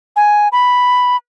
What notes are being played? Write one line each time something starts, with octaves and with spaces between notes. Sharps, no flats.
G#5
B5